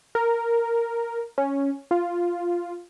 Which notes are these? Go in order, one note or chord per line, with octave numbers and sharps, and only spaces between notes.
A#4
C#4
F4